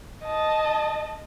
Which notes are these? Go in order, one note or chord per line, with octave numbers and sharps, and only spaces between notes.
D#5 A5